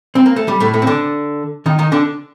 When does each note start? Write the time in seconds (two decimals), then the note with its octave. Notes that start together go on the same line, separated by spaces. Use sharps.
0.15 C4
0.26 A#3
0.36 A3
0.48 G3
0.60 A2 A3
0.74 A2 A3
0.82 C4
0.87 D3 D4
1.66 D#3 D#4
1.79 D#3 D#4
1.92 D3 D4